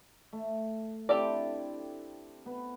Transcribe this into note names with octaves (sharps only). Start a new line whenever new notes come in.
A3
C4 D4 E4 G4 A4 D5
B3